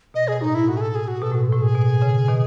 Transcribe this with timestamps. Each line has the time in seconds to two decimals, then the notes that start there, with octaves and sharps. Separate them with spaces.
0.14 B2 D#5
0.28 G#4
0.41 A2 D#4
0.55 E4
0.68 A2 F#4
0.77 G#4
0.81 A4
0.95 G#4
1.08 F#4
1.22 B2 A4
1.32 A2 F#4
1.43 G#2
1.49 A2 A4
1.62 G#4
1.75 B2
2.02 C#3
2.28 B2 D#3